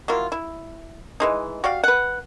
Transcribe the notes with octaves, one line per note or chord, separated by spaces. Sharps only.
F#3 A#3 E4 F4
E4
E3 G#3 D#4
F#4 G4 D5 F5
B4 F#5